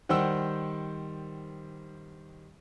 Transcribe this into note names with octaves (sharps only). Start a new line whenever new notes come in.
D#3 G3 C5 F#5 G5 E6